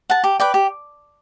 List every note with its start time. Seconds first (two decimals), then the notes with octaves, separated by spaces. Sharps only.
0.10 F#5 A5
0.24 G4
0.40 B4 D5 G5
0.54 G4